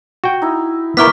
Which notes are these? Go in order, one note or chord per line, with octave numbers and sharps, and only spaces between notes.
F#4 G5
D#4 E4
B3 D#4 E4 A#4 D5 C#6 F6 B6